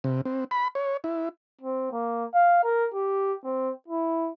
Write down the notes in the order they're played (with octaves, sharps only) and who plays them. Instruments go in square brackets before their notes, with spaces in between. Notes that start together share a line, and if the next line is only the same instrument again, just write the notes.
[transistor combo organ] C3
C4
B5
C#5
E4
[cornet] C4
A#3
F5
A#4
G4
C4
E4